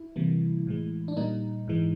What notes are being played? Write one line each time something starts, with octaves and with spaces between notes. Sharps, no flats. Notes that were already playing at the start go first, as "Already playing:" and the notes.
Already playing: E4
C3 E3 G3 A#3
A2 E3 G#3
D4
A#2 G3 A#3 D#4
G#2 E3 G#3